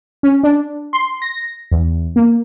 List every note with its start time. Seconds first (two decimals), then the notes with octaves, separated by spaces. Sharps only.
0.23 C#4
0.43 D4
0.93 C6
1.22 A#6
1.71 E2
2.16 A#3